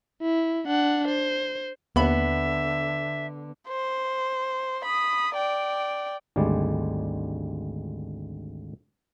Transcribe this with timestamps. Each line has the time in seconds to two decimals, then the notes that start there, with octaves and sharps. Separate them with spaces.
0.22 E4
0.67 D4 F#5
1.08 C5
1.96 D#2 D3 B3 E5 B5
3.68 C5
4.85 B5 D#6
5.34 D5 G5
6.36 G#1 D2 G3 G#3 D5